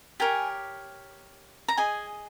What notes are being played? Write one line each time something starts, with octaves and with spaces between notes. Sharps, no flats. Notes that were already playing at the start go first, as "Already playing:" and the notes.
G4 A#4 C#5 G#5
A#5
G#4 D#5 G#5